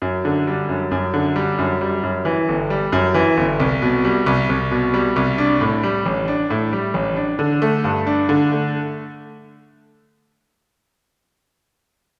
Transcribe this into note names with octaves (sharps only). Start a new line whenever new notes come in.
F#2
D3
G3
F#2
F#2
D3
G3
F#2
G3
F#2
E3
G1
G3
F#2
E3
G1
C2
B2
G3
C2
C2
B2
G3
C2
D4
A2
G3
A1
D4
A2
G3
A1
D4
D3
A3
G2
D4
D3
A3